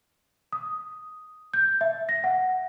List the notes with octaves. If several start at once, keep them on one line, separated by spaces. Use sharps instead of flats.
D#6
G6
E5
A#6
F#5